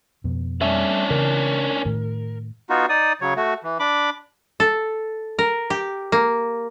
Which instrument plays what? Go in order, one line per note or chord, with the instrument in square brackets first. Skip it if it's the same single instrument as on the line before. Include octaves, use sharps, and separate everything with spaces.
[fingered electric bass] F2 B2
[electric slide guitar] G3 A3 E5 [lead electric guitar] C#4 D4
[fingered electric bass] C#3 E3 [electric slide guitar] A#4
[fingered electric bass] A2 D#3
[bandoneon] B3 D#4 F4 F#4
D#4 D5 D#6
C#3 F#3 C#5
A3 F#4
E3
D4 B5 D6
[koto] A4
A#4
G4
A#3